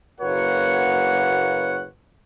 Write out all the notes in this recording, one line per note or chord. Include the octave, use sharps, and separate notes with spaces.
F#1 A#3 F#4 B4 C#5 F#5